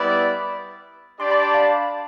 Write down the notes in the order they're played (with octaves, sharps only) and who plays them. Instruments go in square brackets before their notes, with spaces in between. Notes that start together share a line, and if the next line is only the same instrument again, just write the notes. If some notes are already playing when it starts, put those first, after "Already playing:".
Already playing: [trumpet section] G3 B3 E4 B4 D5 [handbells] B5
[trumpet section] D4 G4 D5 [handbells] C6
[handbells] B5
A5
F5